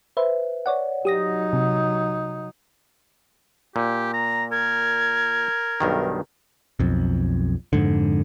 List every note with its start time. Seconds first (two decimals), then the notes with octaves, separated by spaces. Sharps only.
0.17 B4 C5 E5
0.66 C#5 D5 F#5
1.05 F#3 D#4 G4 D#6 A#6
1.53 C3
3.76 A#2 G4
4.14 A#5
4.52 A#4 G#6
5.80 B1 G2 D#3
6.80 B1 F2
7.73 F2 G#2 D3